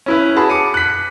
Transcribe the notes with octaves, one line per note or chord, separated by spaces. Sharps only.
C#4 E4 B4
F#4 G#4 A5 B5
D6 C#7 D#7
F#6 B6